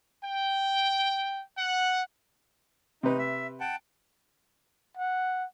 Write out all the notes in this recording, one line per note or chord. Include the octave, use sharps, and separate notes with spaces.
G5
F#5
C3 D#4 B4
E5
F#5 G5 A5
F#5